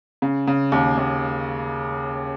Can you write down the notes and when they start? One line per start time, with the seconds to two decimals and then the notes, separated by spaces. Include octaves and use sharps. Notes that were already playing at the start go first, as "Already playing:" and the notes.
0.22 C#3
0.47 C#3
0.72 D#2
0.97 D#2